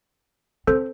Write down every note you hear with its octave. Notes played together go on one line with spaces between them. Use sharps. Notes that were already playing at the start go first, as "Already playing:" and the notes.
C4 A4 C5